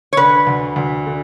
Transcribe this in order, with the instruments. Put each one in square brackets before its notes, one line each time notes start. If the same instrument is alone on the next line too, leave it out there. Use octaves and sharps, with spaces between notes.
[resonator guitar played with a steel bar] C#5
[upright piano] D3 [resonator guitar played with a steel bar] B4
[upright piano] D2
D2
D3